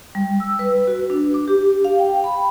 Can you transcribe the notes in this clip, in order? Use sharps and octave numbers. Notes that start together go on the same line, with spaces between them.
G3
E6
B4
F#4
D4
D6
G4
F5
G5
B5